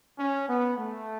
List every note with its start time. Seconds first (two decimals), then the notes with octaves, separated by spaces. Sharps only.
0.19 C#4
0.48 B3
0.78 A3